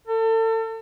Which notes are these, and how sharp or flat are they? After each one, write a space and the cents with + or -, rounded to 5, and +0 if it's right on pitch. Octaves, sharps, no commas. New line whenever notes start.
A4 +35